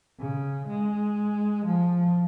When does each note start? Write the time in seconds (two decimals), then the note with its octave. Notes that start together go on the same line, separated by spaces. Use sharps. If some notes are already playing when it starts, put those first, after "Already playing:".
0.20 C#3
0.68 G#3
1.66 F3